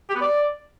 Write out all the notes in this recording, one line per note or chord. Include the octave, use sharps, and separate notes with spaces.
G4
B3
D5